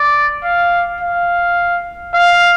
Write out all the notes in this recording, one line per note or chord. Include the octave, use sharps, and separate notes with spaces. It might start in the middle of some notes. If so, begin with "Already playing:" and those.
Already playing: D5
F5
F5
F5